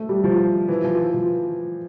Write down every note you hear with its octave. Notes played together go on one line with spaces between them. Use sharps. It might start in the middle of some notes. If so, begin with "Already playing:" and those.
Already playing: A3
G3
F3
E3
F3
E3
F3